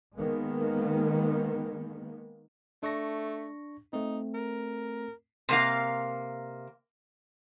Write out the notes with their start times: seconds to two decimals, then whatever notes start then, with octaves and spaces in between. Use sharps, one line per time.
0.17 D#3 G#3 A#3 B3
2.83 A3 D4 C#6 A#6
3.93 A3 C4 D#4
4.34 A#4
5.49 C3 A#3 F5